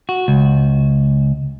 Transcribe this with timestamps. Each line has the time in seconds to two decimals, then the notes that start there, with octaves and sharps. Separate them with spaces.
0.09 F#4
0.28 C#2